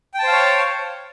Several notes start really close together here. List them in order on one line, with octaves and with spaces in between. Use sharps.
G5 A5 C5 F5 C#5